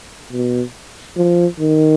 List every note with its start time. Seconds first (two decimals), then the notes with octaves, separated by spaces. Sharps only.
0.32 B2
1.17 F3
1.60 D#3